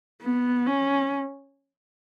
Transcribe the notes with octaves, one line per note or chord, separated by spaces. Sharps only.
B3
C#4